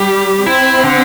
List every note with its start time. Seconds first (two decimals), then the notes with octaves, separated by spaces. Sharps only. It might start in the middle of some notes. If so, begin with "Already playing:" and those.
Already playing: G3 G4
0.46 C4 E4
0.84 D3